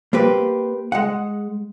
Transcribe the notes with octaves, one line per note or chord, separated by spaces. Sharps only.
A#3 C4 G4 B4
G#3 F#5